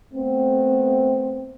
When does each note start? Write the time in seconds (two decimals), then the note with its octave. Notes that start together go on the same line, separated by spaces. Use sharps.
0.14 A3 B3 C4